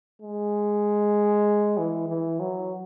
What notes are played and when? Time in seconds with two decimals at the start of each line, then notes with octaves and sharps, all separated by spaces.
0.22 G#3
1.78 E3
2.09 E3
2.40 F#3